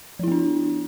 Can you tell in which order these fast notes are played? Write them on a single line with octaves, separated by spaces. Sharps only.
F3 E4 B3 D4